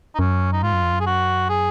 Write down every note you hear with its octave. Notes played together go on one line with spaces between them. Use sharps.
D#4
F#2 C#4
D#4
G#2 F4
F#2
F2
F#2
G#4
F#4
G#4